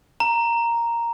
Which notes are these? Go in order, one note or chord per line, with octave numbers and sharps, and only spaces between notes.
A#5